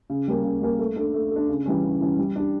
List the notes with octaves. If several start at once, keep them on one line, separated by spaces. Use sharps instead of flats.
C#3
G3 A#3 C#4
C#3
G3 A#3 C#4
A3
D4 A4
A3
D4 A4
C#3
E3 G3 C#4
C#3
E3 G3 C#4
G3
D4 G4